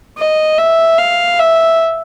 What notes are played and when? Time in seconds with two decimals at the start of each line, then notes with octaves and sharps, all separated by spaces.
0.17 D#5
0.58 E5
0.98 F5
1.39 E5